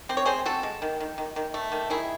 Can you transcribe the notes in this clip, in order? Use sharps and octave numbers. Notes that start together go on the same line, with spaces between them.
C4 C5
C#5
C4 G#4 C5
C4 F#4 A4
G#3
D#3
D#3
D#3
D#3
A3
D#3
D#3 E4 G#4